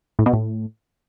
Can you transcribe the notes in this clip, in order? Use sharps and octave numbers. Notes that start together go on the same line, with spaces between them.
A2
B2
A2